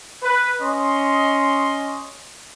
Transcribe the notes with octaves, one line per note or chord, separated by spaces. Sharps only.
B4
C#4 D#5 C6